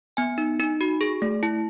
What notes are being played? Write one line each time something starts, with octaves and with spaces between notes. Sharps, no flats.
B3 G#5
D#4
D#4
F#4
G#4
A3
E4